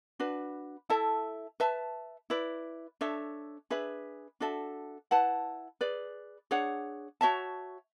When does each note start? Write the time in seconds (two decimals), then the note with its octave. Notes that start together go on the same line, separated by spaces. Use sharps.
0.20 D4 F#4 B4
0.90 E4 A4 E5 A5
1.60 B4 E5 A5
2.30 E4 B4 D5
3.01 D4 A4 C#5 E5
3.70 D4 G#4 B4 E5
4.40 D4 F#4 A4 E5
5.11 E4 B4 F#5 A5
5.81 G#4 B4 D5
6.51 D4 G#4 C#5 F#5
7.21 F#4 C#5 E5 A5